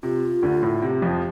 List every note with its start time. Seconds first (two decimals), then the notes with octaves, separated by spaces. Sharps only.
0.03 C3 F4
0.42 D2 D3
0.63 A2
0.82 C3
1.02 F2 F3